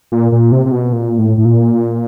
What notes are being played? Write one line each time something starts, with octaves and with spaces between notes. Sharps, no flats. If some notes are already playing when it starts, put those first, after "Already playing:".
A#2
A#2
C3
C3
B2
A#2
A2
A2
A#2